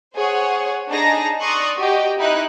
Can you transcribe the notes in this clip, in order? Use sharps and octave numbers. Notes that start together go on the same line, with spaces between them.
G#4 C5 C#5 F#5
D4 D#4 G#4 A5 A#5 A#6
D5 A#5 C6 C#6 D#6 F#6
F#4 G4 D#5 G5
D#4 E4 F#6